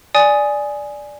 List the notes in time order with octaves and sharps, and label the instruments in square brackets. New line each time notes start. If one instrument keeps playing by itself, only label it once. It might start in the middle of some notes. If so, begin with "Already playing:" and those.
[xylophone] D5 G#5 D#6